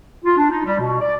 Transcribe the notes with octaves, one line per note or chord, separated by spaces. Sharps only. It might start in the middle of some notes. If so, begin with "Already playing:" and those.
F4
D4
D#4
G3
B2
D5